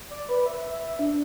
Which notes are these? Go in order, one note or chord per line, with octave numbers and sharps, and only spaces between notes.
D5
B4
E5
E5
E5
D4